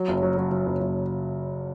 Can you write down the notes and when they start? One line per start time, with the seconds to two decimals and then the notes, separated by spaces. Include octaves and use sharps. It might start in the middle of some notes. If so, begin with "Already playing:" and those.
Already playing: F#3
0.08 F#1
0.23 F#3
0.37 F#3
0.51 F#3
0.66 F#1
0.81 F#1